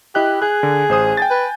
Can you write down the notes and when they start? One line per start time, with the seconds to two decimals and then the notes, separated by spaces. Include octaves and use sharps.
0.15 E4 G4 D#5 F#6
0.42 G#4 F#6
0.63 D3
0.89 A1 C5 D#6
1.17 G5 G#5 A6
1.30 B4